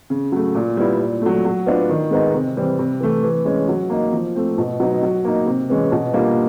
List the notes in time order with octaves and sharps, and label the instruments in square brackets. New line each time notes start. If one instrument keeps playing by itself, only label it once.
[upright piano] C#3
F#3 A3
A#2
G3 B3 E4
A#2
F#3 A3
F#3
B3 D4 F4
D#3
G#3 B3 D#4
C3
E3 G3 C4
C3
E3 A3
E3
G#3 C#4
F#3
A#3 D#4
F3
A3 C4
B2
F#3 B3 D#4
F#3
A#3 D#4
C3
E3 G#3 C#4
B2
G3 A#3 D4 F4